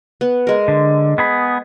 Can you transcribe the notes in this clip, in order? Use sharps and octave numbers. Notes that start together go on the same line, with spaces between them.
B3
G#3 A#4
D3
B3 G#4 B5